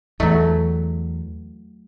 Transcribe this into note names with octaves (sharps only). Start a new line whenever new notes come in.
E2 F#3 A3